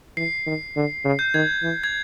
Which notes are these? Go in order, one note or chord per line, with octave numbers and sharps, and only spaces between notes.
E3 C7
D#3
D3
C#3
G6
D#3 G#6
E3
G#6